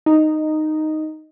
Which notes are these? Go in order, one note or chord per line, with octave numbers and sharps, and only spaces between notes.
D#4